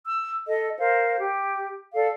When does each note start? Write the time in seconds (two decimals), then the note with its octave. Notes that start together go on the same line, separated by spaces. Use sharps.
0.06 E6
0.47 A4 D#5
0.78 A#4 C5 F5
1.18 G4
1.95 A4 D5 F5